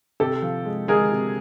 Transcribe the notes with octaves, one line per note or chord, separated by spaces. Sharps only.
C3 G4 A4
F3
G#3
G#3 G#4 A#4
C3